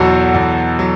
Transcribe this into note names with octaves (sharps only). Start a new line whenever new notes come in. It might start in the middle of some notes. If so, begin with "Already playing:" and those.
Already playing: E2 B2 F#3 F#4 A4
E2
F#3